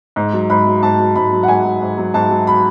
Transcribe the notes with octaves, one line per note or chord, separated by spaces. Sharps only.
G#2
F#3
G#2 B5
F#3
G#2 A5
F#3
G#2 B5
F#3
F#5
G#2 G#5
F#3
G#2
F#3
G#2 A5
F#3
B5